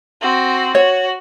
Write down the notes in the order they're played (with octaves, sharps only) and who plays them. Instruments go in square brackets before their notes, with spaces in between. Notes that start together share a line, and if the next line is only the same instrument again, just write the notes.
[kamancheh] C4 F#4
[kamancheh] F#4 [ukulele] C#5